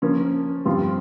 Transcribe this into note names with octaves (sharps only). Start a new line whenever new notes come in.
F3 A#3 C#4
G2 F3 C4 F4